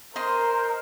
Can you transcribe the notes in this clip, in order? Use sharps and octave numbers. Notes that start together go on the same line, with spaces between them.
A#4 C5 D#5 C6